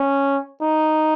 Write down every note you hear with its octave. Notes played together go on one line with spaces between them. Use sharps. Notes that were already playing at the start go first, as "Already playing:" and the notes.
Already playing: C#4
D#4